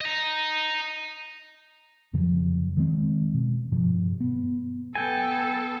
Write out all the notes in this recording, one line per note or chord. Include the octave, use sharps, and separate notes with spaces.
D#5 A#5
F2 C#3 F3 F#3
D#3 G#3 C4
B2
G2 B2 F3
B3
B3 A4 G5 G#5